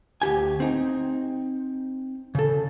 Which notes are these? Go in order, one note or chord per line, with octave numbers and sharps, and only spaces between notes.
D2 G4 G#5
C4 D#4
C#3 A4